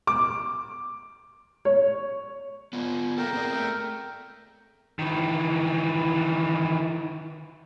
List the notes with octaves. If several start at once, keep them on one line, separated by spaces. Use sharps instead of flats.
D6
C#5
B3 F4
A#3 A4 A#4 G5
C4 G#4 D5
A3
D#3 E3